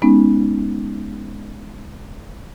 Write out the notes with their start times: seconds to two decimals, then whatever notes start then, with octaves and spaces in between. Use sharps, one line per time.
0.02 G#3 B3 C#4 D#4